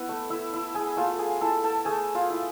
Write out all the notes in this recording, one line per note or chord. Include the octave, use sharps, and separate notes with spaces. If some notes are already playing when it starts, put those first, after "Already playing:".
Already playing: B3 E4 B4
A3
E4 E5
E4
G#4 G#5
A3 F4 F5
G#4 G#5
E4 A4 A5
A4 A5
A3 G#4 G#5
F4 F5
E4